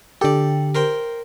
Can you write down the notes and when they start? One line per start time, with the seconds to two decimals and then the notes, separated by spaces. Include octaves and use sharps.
0.21 D3 G4 A4 D5
0.75 A#4 C5 G5